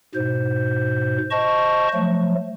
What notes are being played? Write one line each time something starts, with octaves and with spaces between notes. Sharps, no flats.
G#2 B2 C5
C5 D#5 A5 C#6
F3 F#3 A3